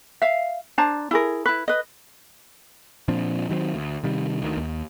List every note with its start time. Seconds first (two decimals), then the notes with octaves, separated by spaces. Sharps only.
0.22 E5 F5
0.78 D4 C5 A5 A#5
1.11 E4 G#4 A#4
1.46 E4 B4
1.68 B4 D#5
3.08 A#2 F3 C4 D4
3.49 D#3 F#3 G3 C4
3.75 D2
4.04 C3 D#3 G3
4.42 D2 D#3
4.57 D#2